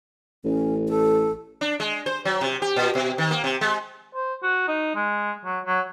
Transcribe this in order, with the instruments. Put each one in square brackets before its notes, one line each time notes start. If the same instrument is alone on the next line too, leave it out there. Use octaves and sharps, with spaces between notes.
[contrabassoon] A1 [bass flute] C#4
[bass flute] A4
[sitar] D4
G#3
C5
F#3
C3
G4
A#2
B2
D#3
A#3
C3
G#3
[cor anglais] C5
F#4
D#4
G#3
F#3
F#3